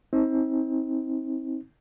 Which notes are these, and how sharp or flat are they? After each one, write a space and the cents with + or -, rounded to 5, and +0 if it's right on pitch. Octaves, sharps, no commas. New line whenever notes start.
C4 +20 D#4 +40